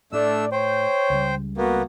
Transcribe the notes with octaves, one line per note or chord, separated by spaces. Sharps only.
A2 A3 D4 D5 E6
C5 C#5 G5
C#2 C#3 G3
A#3 B3 F#4